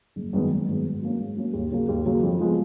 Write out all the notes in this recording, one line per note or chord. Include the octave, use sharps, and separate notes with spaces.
F#1
F#2 D#3 G#3 B3
F#1
F#2 D#3 G#3 B3
G#2
F#3 A#3 C#4
G#2
F#3 A#3 C#4
D#2
C#3 F#3 A#3
D#2
C#3 F#3 A#3
F2
F3 G#3 B3